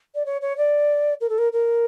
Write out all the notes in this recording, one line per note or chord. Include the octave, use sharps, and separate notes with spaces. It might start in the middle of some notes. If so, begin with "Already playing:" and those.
D5
C#5
C#5
D5
A#4
A4
A#4
A#4